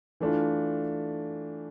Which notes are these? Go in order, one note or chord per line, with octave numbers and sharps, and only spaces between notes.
E3 A3 D4 F4